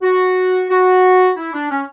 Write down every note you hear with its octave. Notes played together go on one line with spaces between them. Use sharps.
F#4
F#4
E4
D4
C#4